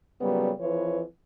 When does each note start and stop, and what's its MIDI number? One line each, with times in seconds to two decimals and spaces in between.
0.21 0.51 46
0.21 0.51 49
0.21 0.51 54
0.21 0.51 55
0.21 0.51 59
0.59 1.02 41
0.59 1.02 52
0.59 1.02 53
0.59 1.02 71
0.59 1.02 73